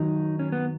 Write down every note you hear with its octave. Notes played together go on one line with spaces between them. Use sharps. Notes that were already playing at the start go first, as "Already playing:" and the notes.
Already playing: F#2 D#3 F#3 D#4
C#4
B3